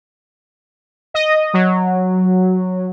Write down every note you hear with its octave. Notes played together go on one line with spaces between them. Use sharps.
D#5
F#3